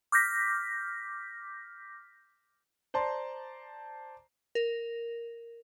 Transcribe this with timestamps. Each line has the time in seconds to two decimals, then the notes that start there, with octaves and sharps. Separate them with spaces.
0.12 D6 F6 G6 A#6 B6
2.94 C5 D5 A5 A#5 C6
4.55 A#4